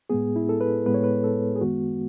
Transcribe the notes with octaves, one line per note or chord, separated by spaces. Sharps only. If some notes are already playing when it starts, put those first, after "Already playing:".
A2 G#3 B3 G#4
E4
A4
B4
A2 G#3 B3 B4
C#5
B4
A4
G#4
F#2 D#3 G#3 B3 F#4